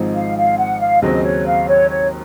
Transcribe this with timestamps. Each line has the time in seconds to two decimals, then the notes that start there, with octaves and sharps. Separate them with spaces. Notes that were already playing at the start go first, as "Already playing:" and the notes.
Already playing: G#1 G#2 F3 C4 D#4
0.15 F5
0.37 F5
0.59 F#5
0.80 F5
1.02 D#2 C#3 F#3 C4 D#5
1.24 C#5
1.47 F5
1.68 C#5
1.90 C#5